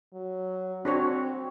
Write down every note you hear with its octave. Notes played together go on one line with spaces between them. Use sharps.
F#3
C4 D4 F#4 C#5